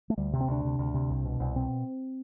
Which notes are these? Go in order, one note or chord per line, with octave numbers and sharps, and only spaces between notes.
A3
D2 G3
C3
C4
D2 D4
C3
D2
C3
C2
B2
C2
B2 C4